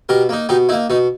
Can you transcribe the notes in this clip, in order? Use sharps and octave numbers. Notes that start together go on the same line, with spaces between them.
B2 G4 A#4
A#3 D#4
B2 D#4 G4
A#3 D#4 E4
B2 D#4